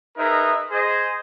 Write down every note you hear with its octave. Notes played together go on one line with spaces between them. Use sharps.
D#4 G#4 A#4 B4 D#5 E5
G#4 C5 D#5